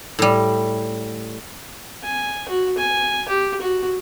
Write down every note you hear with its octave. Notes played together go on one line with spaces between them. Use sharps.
A2 G3
G#5
F#4
G#5
G4
F#4